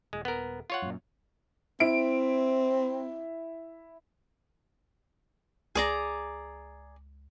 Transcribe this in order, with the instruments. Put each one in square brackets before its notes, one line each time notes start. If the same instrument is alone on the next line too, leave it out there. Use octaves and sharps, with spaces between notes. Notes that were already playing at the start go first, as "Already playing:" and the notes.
[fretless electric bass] D#1 [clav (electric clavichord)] G#3
[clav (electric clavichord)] B3 A#4
F4 C#5 F#5
[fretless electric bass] F#2 A#2
[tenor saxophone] C4 [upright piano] E4 D7
[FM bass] C#2 [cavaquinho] G#4 D5 A#5